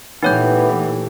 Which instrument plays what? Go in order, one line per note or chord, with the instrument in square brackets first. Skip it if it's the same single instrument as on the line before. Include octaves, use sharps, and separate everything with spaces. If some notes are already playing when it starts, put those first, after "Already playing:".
[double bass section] A#2 E3 [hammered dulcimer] A3 G4 [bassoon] B3 [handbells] D#4 C#5 G6